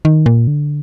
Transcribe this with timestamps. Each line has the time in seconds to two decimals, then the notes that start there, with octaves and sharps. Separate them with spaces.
0.05 D#3
0.26 A#2
0.47 D3